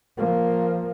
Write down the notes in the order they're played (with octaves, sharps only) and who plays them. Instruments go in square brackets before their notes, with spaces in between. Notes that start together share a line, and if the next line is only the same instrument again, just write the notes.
[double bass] F3 A#3